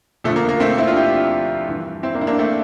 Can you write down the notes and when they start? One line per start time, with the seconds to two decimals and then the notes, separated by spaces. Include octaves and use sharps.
0.24 F2 D3 F3 A3
0.36 A#3
0.49 A#3
0.60 A3 C4
0.78 C4 E4
0.87 D4 F4
0.96 E4 G4
1.68 G2 E3
2.03 C4 E4
2.15 A#3 D4
2.21 E4
2.27 A#3 D4
2.39 A3 C4